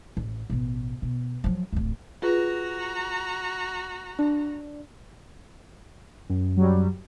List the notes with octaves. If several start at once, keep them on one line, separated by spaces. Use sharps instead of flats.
A1
A1 B2
B2
F3 F#3
D1 A1
F4 F#4 G#4 B4 A#5
D4 A5
F#2
F#3 G3